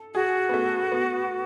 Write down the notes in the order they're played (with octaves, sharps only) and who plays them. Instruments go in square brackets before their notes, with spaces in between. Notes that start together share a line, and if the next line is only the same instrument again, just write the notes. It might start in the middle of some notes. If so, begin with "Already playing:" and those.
Already playing: [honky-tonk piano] A4
[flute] F#4 [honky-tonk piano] G#4
[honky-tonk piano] B3
A3
B3